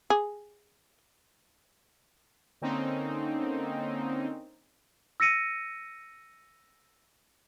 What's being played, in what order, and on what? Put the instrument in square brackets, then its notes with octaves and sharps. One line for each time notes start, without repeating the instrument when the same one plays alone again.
[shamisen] G#4
[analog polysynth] D3 A#3 C4 C#4 D#4
[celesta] E6 A#6 C#7 D#7